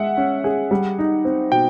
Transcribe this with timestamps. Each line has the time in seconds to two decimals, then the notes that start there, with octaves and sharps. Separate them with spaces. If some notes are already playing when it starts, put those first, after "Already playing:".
Already playing: G#3 E5 F#5
0.17 C#4
0.44 G#4
0.71 G3
0.99 D#4
1.25 C4
1.52 B2 G5